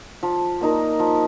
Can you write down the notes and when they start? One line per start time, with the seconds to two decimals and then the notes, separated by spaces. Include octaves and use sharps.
0.23 F3
0.61 A#3 D#4 A#4
1.00 F3